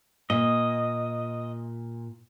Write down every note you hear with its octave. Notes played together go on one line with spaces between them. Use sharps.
A#2 D#5